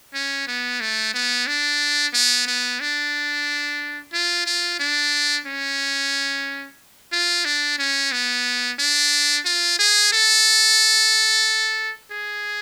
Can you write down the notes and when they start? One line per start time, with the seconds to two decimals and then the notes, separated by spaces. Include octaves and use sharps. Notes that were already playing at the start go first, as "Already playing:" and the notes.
0.14 C#4
0.47 B3
0.81 A3
1.14 B3
1.47 D4
2.14 B3
2.47 B3
2.80 D4
4.13 F4
4.46 F4
4.80 D4
5.46 C#4
7.12 F4
7.45 D4
7.79 C#4
8.12 B3
8.79 D4
9.45 F4
9.79 G#4
10.12 A4
12.11 G#4